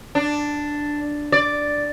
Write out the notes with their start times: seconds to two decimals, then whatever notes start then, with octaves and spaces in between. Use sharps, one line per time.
0.15 D4
1.32 D5